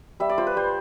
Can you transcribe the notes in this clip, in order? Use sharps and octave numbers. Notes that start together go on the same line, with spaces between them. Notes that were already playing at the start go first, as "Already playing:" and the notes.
G3 E5
D5
F4 C5
B4
G3 C5